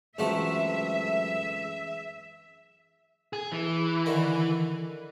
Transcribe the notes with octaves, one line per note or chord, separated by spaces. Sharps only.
C#2 F#2 E3 A3 C4 E4 E5
G#4
E3
D3 D#3